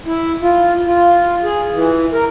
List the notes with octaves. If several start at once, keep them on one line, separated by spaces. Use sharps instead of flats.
E4
F4
F4
G#4
E3
A#4